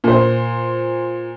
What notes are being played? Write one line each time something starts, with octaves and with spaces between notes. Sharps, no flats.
A#2 C5